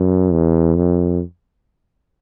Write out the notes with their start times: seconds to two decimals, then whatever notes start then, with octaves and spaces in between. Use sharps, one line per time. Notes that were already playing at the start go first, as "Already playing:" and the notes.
Already playing: F#2
0.32 E2
0.76 F2